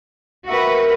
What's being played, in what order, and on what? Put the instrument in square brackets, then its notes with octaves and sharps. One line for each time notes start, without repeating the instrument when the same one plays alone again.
[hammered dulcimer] D#3 A#3 E5 [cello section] F#4 B4